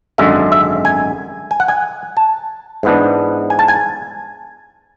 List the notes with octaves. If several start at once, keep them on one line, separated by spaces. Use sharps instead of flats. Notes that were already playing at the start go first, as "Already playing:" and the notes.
G#1 F#2 D3 G#3 E5
E5
G#5
G#5
F#5
G#5
A5
G#2 E3 B3 D4
G#5
A5
G#5